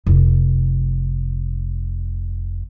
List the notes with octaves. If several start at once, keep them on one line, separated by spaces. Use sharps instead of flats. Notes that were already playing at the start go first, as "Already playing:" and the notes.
F1 F4